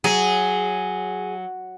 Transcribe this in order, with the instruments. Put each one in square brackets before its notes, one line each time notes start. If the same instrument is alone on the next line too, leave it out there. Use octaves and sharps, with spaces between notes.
[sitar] F#3 [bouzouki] G#4